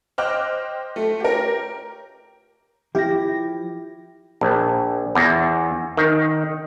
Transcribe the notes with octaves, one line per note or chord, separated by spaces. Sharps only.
C5 D#5 G5 D6 F6 F#6
A3
G4 A#4
F3 E4 G4 A#6
A#1
E2
D#3